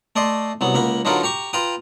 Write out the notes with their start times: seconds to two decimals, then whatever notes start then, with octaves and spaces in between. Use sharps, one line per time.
0.16 A3 D5 D#5 C6
0.61 C2 F#3 B3
0.74 C#2 A#3 F#5 B5
1.05 D3 F#3 D#4 F4 A#4 B4
1.23 G4 A#5 C#6
1.53 F4 B4 G5 A#5 D#6